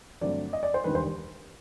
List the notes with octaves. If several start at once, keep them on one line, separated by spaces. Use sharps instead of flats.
G2 D3 F#3 A3 C4 D5
D#5
D5
C5
E1 D#2 D3 G3 B4
C5